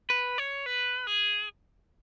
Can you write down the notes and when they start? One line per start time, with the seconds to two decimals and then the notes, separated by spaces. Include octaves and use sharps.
0.10 B4
0.38 C#5
0.66 B4
1.07 G#4